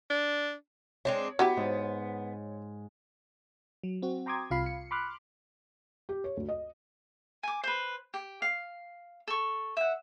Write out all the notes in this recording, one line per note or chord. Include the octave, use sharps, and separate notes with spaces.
D4
G#3 C4 D4 C#5
F#3 B3 E4 G4
G#2
F#3
C4 F#4
G5 A#5 C6 D6 D#6 G#6
C2 C3 F4 F5 B5 C7
C#7
B5 C6 D6 F6 F#6
G4
C#5
D2
D#5
G#5 D6
B4 C5
G4
F5
A4 C#6
E5 F#5